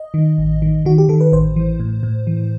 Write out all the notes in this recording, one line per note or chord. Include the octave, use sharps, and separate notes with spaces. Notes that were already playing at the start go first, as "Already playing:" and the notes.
Already playing: D#5
D#3
A1
D#3
D#3 F#4
G4
D#3 A4
B4
A1 C5
E3
A2
A2
E3